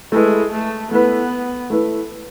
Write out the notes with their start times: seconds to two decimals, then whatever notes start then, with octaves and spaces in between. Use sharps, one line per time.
0.12 G#3 A3 E4 B4
0.51 A3
0.91 A3 B3 E4 B4
1.70 A3 E4 B4